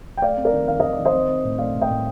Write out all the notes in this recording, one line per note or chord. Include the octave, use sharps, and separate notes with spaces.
G5
A3 D5 F5
C4
A#4 D5
D#3
D#3 F5
D#3 D#5
D5
D#3
C5 D#5
C4
C4
A2
A3 D5 F5
A2
D#5 G5
A2